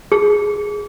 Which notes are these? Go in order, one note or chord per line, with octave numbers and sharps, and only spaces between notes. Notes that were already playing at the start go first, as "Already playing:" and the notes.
G#4